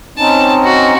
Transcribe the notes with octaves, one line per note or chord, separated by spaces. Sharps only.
C4 C#4 D#4 A5
F#4